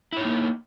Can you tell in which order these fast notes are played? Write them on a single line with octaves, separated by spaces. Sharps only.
E4 C#5 D#4 A#3